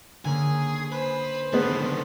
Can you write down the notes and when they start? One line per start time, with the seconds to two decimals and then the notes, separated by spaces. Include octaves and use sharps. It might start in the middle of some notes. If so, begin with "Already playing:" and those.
0.25 D3 A#3 C#4 G#4
0.92 B4 C5
1.53 D3 D#3 G#3 B3 C#4 A4